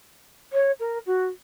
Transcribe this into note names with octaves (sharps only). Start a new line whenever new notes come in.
C#5
A#4
F#4